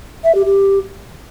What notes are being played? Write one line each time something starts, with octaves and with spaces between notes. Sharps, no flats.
E5
G4
G4